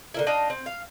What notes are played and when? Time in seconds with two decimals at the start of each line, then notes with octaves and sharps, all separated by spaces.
0.14 D3 A#3 E4
0.27 D4 D#4 D#5 F5
0.50 C4
0.66 F5